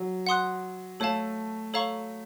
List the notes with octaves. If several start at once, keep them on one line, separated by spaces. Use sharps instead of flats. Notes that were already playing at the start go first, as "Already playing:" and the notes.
Already playing: F#3
F#5 C6 D#6 F#6
A3 A4 C#5 F5 A5
A4 C#5 F5 A#5 C#6